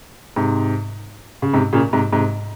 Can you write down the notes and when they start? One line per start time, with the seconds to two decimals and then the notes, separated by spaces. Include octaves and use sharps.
0.36 G#2 C3
1.42 C#3
1.54 G#2 C3
1.73 A#2 C#3
1.93 G#2 C3
2.13 G#2 C3